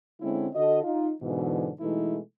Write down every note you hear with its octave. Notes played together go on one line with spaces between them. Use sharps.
D3 G#3 C4 C#4 E4
D3 F#4 A4 D#5
D#4 F4
G#2 B2 D3 E3
B2 E3 G#3 A3 D#4 E4